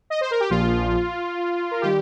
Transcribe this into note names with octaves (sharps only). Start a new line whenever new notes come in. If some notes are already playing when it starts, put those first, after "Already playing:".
D#5
C5
A#4
G4
A#1 A#2 F3 F4
A#4
D#3 G3 G4